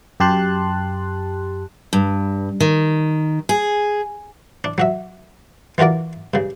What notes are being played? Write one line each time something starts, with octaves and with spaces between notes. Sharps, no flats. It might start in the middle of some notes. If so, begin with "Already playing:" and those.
F#2 G4 A5 C6 F#6
G2
D#3
G#4
D4
F#3 F#4 E5
E3 F4 F#4 A#4 D5
G2 C#3